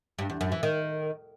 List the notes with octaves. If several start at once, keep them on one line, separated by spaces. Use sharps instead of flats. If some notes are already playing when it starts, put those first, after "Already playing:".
G2
E2
F#2
E3
D#3